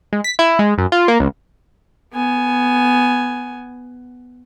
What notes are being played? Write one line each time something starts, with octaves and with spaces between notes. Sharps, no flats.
G#3
B6
E4
G#3
F#2
F4
A#3
C#2
B3 G#5